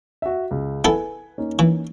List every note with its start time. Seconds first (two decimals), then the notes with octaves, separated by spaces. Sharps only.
0.22 F#4 E5
0.51 C#2
0.84 B3 E4 A4 B4 G#5
1.38 A#3 C#4 D#4
1.59 E3